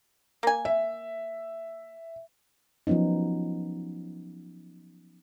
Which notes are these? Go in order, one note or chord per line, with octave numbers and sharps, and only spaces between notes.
A#3 G#5
E5
F3 F#3 B3 C#4 D#4